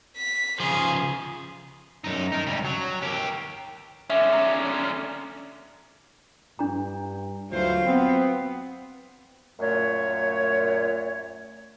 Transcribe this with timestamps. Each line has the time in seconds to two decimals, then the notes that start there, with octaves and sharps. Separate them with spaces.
0.18 B6
0.60 C#3 F3 G#4
2.04 F#2 D#4
2.32 D#4 A#4
2.47 C#2 G3
2.65 F#3
3.02 G4 A#4
4.10 D3 C#4 E5
4.33 A#5
6.59 G2 D4 A#5
7.51 D2 E3 F#3 F4 C5 F5
7.85 B3 C4
9.60 F#2 A#2 A3 C#5